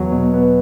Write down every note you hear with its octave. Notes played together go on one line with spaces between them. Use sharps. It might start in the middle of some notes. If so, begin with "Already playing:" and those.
Already playing: E2 F#3
B2
B3